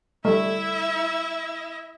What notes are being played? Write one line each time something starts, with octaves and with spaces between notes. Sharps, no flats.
G3 A3 E4 E5